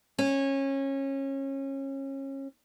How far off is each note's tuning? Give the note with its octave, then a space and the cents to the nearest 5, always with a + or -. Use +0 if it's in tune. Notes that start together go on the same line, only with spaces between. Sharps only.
C#4 -25